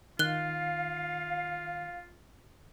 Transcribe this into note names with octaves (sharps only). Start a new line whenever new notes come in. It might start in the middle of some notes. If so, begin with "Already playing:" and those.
D#3 F4 F5 F#6 G7